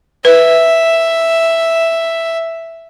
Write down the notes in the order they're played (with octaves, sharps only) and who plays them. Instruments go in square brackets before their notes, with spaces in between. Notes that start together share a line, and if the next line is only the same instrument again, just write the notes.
[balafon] B4 [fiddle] E5